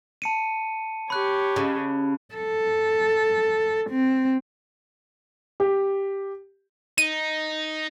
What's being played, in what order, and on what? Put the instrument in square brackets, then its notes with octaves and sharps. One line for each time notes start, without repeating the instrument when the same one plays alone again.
[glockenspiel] A5 C#7 D#7
[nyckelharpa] G4 C#5 [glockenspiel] B5 F#6
[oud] C#3
[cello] A4
C4
[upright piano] G4
[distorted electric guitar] D#4 [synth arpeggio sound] D#7